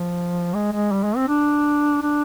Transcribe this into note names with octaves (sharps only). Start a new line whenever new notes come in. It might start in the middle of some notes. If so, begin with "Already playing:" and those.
Already playing: F3
G#3
G#3
G3
G#3
C4
D4
D4